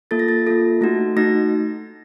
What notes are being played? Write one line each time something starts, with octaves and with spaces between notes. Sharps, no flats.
A#3 F4 A4 A6
A#6
A6
A#3 F4 A4 A#6
A3 D#4 F#4 A#6
A3 D#4 F#4 A#6